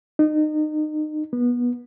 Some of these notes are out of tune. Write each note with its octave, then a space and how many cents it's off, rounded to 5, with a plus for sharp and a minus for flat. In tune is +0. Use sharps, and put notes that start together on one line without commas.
D#4 -30
B3 -20